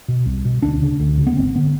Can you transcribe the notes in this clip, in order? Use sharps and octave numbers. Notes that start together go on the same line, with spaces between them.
B2
C2
B2
D2 D4
C#3
D2
C#3
B3
G#1 C4
D3 B3